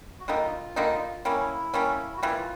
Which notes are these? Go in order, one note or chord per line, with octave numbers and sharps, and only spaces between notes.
F#4
D3 G3 A#3 D#4 F4
D3 G3 A#3 D#4
G3 A#3 C#4 E4
G3 A#3 C#4
F#4
E3 G3 A#3 F4